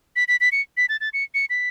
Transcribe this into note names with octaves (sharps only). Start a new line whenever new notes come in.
B6
B6
B6
C#7
B6
A6
A6
C#7
C#7
B6